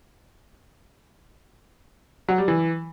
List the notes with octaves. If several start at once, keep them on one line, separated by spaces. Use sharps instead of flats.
F#3
G3
E3